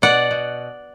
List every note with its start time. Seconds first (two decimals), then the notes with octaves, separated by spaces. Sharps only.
0.02 B2 D5 F#5
0.31 B2